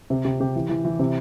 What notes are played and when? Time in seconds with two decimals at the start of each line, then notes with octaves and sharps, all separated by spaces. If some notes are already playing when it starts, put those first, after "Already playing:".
0.10 C3 G4
0.25 C3 G4
0.40 C3 G4
0.55 E3
0.69 E3
0.85 E3
0.99 C3